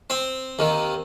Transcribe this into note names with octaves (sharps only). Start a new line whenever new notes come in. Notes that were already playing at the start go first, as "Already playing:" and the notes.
C4
D#2 D#3